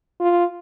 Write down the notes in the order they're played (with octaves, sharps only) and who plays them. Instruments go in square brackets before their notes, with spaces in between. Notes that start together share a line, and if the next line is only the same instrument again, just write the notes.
[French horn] F4